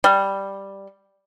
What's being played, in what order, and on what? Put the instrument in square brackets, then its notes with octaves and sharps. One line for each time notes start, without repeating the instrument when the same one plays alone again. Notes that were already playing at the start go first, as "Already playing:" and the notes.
[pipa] G3